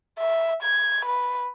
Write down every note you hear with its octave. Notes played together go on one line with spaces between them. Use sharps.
E5
G#6
B4